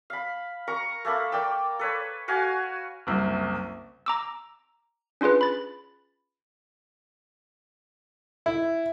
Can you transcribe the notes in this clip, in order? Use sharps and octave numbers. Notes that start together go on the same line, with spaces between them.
F5 B5
A#4 A#5 C#6
A3 A#3 A5 B5
A#4 D5 G5 E6
A4 B4 C#5
F#4 F5 G#5
F#1 C2
A#5 D6 E6
C#4 D4 F4 G#4 B4
B5 A6
E4